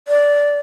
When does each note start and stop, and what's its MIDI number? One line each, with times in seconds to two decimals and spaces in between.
0.08 0.60 74